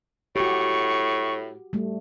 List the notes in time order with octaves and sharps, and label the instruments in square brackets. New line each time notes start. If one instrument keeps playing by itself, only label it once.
[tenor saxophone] A2 [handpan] F#4 G4 [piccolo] C#6
[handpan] G3 A3